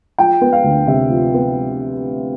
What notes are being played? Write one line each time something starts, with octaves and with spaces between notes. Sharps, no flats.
F3 G5
B3
F5
D2
C3 E5
F3
B3